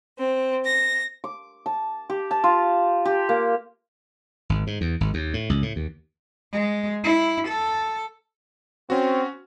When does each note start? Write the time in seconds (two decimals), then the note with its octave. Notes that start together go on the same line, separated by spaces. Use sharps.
0.18 C4
0.65 A#6
1.24 D6
1.66 A5
2.10 G4
2.31 A5
2.44 F4
3.05 G4
3.29 A#3
4.49 G#1
4.67 G#2
4.81 E2
5.01 G#1
5.14 D#2
5.34 A2
5.50 C#2
5.62 A2
5.76 D#2
6.53 G#3
7.04 E4
7.48 A4
8.90 C4 C#4 F#4